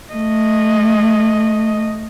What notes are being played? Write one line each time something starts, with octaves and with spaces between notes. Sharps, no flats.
A3 D#5